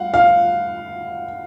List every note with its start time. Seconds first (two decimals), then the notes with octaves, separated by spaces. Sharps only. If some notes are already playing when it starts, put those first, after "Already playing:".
Already playing: F5 F#5
0.14 F5